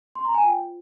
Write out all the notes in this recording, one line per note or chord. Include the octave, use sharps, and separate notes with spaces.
C6
A#5
G#5
F4 C5 G5